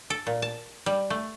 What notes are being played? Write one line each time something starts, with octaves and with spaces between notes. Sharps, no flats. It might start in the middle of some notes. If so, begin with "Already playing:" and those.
A4
A#2
A5
G3
A3